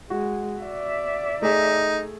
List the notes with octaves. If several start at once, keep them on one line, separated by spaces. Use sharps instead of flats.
G#3 F#4
D5 E5
A3 D#4 G#4